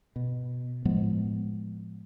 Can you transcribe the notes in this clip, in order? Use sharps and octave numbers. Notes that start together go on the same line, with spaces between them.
B2
A2 F3 G#3 B3